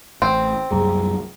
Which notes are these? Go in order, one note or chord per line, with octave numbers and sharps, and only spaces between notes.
A1 C4
C2 F#2 G3 G#4 A#5